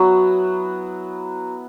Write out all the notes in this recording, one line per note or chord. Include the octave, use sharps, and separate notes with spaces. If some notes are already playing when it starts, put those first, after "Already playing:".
Already playing: F#3 B3 E4 F#4